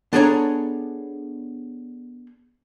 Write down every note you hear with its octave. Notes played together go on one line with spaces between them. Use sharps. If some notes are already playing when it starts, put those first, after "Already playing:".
B3 D4 G#4 A4 C#5 A#5